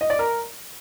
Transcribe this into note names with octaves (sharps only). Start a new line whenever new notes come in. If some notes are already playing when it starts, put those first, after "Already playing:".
D#5
D5
A#4